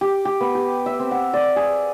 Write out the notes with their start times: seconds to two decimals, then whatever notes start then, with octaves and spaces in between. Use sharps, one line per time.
0.01 G4
0.25 G4
0.41 B3
0.55 G4
0.86 E5
0.99 C4
1.11 F#5
1.33 D5
1.56 G#4